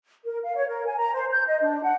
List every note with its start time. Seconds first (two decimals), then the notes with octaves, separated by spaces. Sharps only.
0.24 A#4
0.44 F5
0.56 C#5
0.68 A#4
0.86 G#5
0.98 A#5
1.14 C5
1.31 G6
1.47 D#5
1.62 D4
1.83 F#5